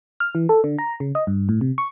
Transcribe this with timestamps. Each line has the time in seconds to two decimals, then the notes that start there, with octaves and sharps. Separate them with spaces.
0.20 F6
0.35 E3
0.49 A4
0.64 D3
0.78 A#5
1.00 C#3
1.15 D#5
1.27 G2
1.49 A2
1.61 C3
1.78 C#6